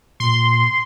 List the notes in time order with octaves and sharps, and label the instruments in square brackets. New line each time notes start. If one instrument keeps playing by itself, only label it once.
[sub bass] A#2 [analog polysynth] C6